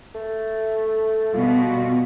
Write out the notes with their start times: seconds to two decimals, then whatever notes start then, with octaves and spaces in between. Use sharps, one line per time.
0.15 A3
1.34 B2 G3 F4 F#4